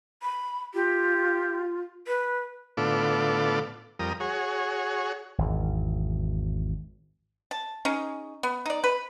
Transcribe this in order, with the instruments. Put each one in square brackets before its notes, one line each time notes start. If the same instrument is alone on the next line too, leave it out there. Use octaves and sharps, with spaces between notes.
[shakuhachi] B5
[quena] F4 [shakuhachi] G4
[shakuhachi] B4
[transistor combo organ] A2 D3 B3 F4 A4 D6
F2 G3 A#4 D#6
F#4 G#4 C#5
[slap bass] G#1 E2
[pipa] A5
C#4 D#4 G#4
B3
D#4 D5
B4